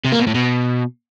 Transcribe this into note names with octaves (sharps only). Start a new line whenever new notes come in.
C3
A#3
B2
A2
B2